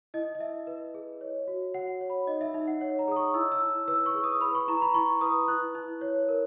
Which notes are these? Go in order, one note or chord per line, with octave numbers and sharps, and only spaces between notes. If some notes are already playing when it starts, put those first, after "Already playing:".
E4 D#5
D#5
E4 E5
B4
G#4
C#5
F#4
F#4 F#5
C#5
B5
D#4 D#5
E5
D#4 E5
F#5
C#5 F#5
A#5
G#4 D#6
C#6
E4 E6
E6
E4
B4 E6
C#6
G#4
D#6
B4 B5
C#6
E4 A#5
B5
E4 C#6
B4 D#6
E4 F#6
E4
C#5
A#4